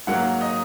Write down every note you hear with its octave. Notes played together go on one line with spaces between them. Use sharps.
G#2 F#3 A#3 F#5
D#5